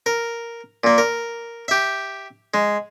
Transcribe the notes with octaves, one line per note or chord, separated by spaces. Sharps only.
A#4
A#2 A#3
A#4
G4 E5
G#3